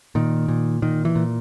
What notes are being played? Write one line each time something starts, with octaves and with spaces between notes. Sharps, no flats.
A#2 D#3
A#2
A#2 D#3
E3
A#2